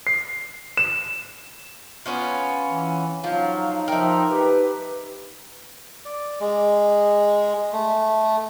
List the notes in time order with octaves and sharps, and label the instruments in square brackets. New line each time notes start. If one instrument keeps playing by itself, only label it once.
[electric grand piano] C7
E7
[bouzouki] B3 C#4 F4
[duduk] E3
[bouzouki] F3 [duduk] F#3 [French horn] D#4 [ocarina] F5
[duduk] F3 [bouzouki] A#4 E5 [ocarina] G5
[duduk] G4 [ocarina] B4
[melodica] D5
G#3
A3